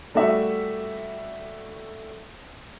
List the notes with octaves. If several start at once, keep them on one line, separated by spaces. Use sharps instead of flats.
G3 A3 F#4 E5